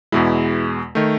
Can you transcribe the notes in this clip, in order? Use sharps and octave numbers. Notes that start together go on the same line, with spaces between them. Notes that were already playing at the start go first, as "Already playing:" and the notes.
E2 B2 G#3 E4
D#3 A3